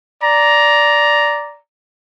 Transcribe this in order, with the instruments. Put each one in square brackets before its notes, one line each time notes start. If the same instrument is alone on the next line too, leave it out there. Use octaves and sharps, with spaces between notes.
[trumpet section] D5 A#5